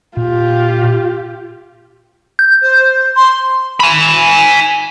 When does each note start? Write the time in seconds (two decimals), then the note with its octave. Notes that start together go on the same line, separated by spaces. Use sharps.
0.17 A#2 F4 G4
2.39 G6
2.62 C5
3.17 C6
3.80 G#5 B5